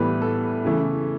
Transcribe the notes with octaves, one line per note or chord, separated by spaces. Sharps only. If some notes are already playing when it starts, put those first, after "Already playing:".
Already playing: A2 E3 G3 B3 B4
A4
C#3 E3 A3